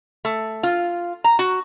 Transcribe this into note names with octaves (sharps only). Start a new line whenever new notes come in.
A3
F4
A#5
F#4